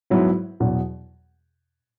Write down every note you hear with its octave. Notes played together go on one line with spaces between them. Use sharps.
G#2 F#3 B3 E4
E2 B2 F#3